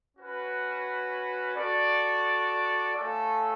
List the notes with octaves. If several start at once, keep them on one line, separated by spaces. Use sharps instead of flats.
C#4 F#4 B4
F#4 A4 D5
A3 C#4 F4 A4